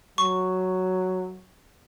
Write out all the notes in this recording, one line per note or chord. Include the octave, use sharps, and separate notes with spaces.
F#3 C#6